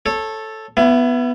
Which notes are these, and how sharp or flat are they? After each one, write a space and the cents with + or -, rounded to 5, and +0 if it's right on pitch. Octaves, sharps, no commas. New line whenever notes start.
A4 +0 C#5 -20
B3 +0 E4 +30